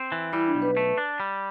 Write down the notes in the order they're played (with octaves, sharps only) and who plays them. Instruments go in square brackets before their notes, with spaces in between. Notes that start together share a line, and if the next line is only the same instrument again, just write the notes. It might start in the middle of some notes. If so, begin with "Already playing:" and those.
Already playing: [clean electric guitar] C4
E3
[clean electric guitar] G3 [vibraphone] E4
[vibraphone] D4
[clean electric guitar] B1
[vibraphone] B4
[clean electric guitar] A3
D4
G3